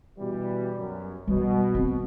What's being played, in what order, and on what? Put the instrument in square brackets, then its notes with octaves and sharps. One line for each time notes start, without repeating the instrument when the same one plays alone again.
[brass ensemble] B2 E3 G3
F#2
[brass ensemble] B2 [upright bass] G3
[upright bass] B3 C4